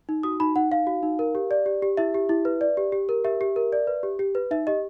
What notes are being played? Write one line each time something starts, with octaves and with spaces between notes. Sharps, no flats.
D#4
F#4 D#6
D#4 B5
D#4 F#5
D#4 F5
F#4
D#4
A#4
G4
D5
G4
G4
E4 E5
G4
E4
B4
D5
G4
G4
A#4
G4 E5
G4
A#4
D5
B4
G4
G4
B4
D#4 E5
G4 D#5